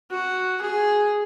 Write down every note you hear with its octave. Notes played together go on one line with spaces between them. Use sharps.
F#4
G#4